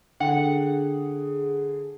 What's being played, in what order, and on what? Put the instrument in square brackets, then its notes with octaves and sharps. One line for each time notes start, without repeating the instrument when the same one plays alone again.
[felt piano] D3 [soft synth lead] G#4 [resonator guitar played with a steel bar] F#5 [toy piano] G5